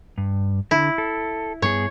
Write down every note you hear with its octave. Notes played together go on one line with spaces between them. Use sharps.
G2
D3 E4
A4
G2 B3 G#4 C#5